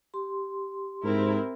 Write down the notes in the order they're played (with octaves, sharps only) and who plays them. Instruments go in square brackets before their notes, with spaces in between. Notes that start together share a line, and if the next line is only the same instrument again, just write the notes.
[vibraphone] G4 C6
[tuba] G#2 [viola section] C4 E4 A#4